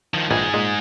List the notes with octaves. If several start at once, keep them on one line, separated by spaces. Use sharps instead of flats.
D#3 F3
A#1 G#2 D#3 E3 G#4
A#2 G#3